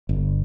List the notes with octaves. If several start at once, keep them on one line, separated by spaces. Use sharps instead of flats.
G1